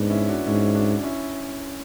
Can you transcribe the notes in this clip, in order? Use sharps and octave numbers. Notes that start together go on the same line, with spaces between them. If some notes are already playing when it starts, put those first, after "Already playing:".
Already playing: G#2 B3 D4
C#4 E4
D4 F#4
G#2 C#4 E4
D4 F#4
C#4 E4